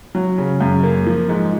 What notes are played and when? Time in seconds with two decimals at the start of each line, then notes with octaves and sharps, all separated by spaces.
0.15 F#3
0.38 C#3
0.61 F#2
0.83 A#3
1.06 F3
1.29 G#2